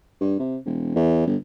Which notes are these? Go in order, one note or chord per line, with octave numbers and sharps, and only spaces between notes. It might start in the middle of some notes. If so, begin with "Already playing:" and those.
G2
C3
E1
E2
G1